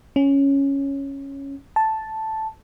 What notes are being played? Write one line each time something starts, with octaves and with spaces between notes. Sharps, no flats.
C#4
A5